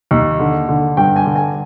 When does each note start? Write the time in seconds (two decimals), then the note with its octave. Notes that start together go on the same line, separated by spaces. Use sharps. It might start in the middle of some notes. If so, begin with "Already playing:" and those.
0.11 D#2
0.39 D3
0.69 D3
0.97 G2 G5
1.16 G#5
1.26 D3
1.36 G#5